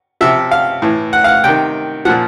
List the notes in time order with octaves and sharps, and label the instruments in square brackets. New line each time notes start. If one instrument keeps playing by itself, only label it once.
[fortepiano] C3 F3 E5
F5
A2 E3
F#5
F5
F#5
C3 D#3 G5
F3 F#5
A#2